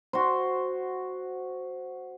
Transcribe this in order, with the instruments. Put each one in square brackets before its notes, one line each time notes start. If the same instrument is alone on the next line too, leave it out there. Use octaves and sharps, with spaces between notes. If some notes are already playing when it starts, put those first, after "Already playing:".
[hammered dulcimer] F#4 C5